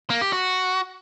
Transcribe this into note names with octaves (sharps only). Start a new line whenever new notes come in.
A#3
G4
F#4